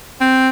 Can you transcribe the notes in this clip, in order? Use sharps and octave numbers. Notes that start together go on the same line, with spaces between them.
C4